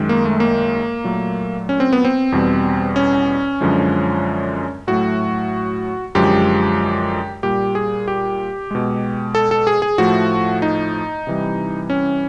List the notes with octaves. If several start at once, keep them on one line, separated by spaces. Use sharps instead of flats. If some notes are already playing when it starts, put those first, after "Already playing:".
Already playing: F#2 D#3 G#3
A#3
A3
A#3
A#2 F#3 A3
C#4
C4
B3
C4
E2 B2 G3
C#4
F#2 D3 F3 G#3
A2 F#3 A3 F#4
F#2 D3 F3 G#3 G4
A#2 G3 G4
G#4
G4
B2 G#3
A4
A4
G#4
G#4
A2 F3 A3 F#4
D#4
C3 E3 G3
C#4